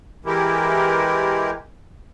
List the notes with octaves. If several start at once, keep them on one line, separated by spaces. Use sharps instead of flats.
E3 G#3 E4 G4 A#4